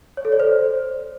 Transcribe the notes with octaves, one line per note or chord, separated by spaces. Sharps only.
C#5
A4
D5
C5